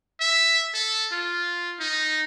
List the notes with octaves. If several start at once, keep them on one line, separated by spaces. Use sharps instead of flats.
E5
A4
F4
D#4